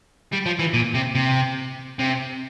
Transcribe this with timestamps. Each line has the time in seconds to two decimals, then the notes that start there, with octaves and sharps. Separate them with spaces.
0.32 G3
0.46 F3
0.59 E3
0.74 A#2
0.94 C3
1.15 C3
1.99 C3